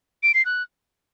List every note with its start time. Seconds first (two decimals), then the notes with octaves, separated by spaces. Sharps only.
0.23 D7
0.34 C7
0.45 F#6